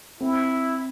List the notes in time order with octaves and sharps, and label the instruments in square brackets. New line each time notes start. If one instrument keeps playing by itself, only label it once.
[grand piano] C4 [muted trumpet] E4